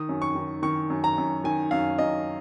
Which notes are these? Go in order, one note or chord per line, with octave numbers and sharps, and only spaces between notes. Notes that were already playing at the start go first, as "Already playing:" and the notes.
Already playing: D#3 D#6
F#2
C#6
D#3
D#3 C#6
F#2
A#5
F#2
D#3 G#5
F#2 F5
F#2 D#5